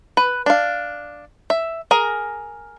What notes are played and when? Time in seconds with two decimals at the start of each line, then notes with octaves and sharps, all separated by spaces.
0.17 B4
0.46 D4 F5
1.50 E5
1.91 G#4 A#4